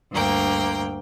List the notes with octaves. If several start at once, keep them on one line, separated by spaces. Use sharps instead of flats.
D2 G2 A#3 G5